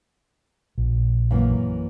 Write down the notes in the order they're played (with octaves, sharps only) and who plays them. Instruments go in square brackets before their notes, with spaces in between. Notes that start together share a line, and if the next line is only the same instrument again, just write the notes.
[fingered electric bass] A#1
[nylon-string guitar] F#2 E3 A#3